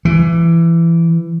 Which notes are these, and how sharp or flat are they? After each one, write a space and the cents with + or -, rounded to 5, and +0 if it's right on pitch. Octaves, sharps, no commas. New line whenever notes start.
E3 +20